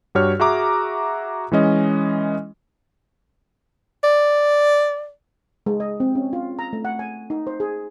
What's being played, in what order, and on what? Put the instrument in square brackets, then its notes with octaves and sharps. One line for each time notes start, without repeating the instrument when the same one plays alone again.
[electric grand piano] G2 F#4 G4 C#5 F6
F#4 G#4 E5 A#5 D6
E3 G#3 C#4 D#5
[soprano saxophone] D5
[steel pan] G#3
D#5
C4
C#4
F4
A#5
A3
F#5
G#5
D#4
C5
G#4